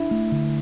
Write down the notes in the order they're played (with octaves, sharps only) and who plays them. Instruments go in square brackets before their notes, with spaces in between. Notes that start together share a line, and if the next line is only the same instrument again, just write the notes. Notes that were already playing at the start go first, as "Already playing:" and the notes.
Already playing: [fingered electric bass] D4 [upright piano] E4
[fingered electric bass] A3
D3